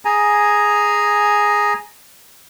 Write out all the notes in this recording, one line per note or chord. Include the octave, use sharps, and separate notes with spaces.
G#4 G#5 A#5